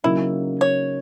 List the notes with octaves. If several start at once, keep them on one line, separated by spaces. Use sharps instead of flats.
C#3 F#3 A#3 D#4 E4
C#5